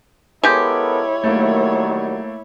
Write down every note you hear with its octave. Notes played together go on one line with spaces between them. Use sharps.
G#3 B3 E4 G4 A4 A#4 C#5 D6
D#3 F#3 G3 A3 A#3